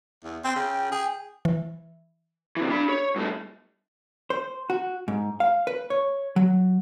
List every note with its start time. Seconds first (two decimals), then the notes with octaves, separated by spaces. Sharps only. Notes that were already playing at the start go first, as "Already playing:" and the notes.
0.24 E2
0.44 C4 G5
0.56 C#3
0.92 G#4
1.45 E3
2.57 C3 E3
2.70 D4 B5
2.89 C#5
3.16 G2 A3
4.30 C5
4.70 F#4
5.08 G#2
5.40 F5
5.67 B4
5.90 C#5
6.36 F#3